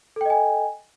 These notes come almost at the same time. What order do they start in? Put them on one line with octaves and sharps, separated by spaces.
A4 G5 D#5 G#5